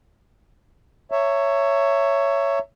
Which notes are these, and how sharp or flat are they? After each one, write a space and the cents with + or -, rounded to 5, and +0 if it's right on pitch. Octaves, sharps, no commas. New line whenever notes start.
C#5 +5 E5 +15 A#5 -30